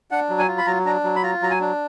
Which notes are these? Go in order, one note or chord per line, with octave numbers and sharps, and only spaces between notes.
D4 F#5
F#3
G#5
F4
B5
F#3 A#5
D4 A#5
F#3
B5
F4 A#5
F#3 A#5
G#5
D4